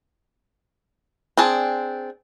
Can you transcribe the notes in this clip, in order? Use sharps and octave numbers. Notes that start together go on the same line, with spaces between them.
C4 D4 G#4 A5